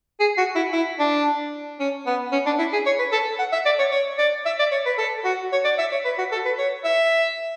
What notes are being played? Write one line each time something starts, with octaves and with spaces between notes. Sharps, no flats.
G#4
F#4
E4
E4
D4
C#4
B3
C#4
D4
E4
G#4
C#5
B4
A4
F#5
E5
D5
C#5
C#5
D5
E5
D5
C#5
B4
A4
F#4
C#5
D5
E5
C#5
B4
F#4
A4
B4
C#5
E5